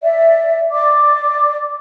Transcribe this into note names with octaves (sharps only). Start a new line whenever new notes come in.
D5 E5
D5 D6